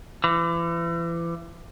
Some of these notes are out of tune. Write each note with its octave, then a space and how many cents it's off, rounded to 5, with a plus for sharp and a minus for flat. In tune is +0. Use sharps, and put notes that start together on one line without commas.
E3 +35